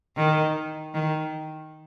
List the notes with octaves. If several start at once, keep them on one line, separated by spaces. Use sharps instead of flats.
D#3
D#3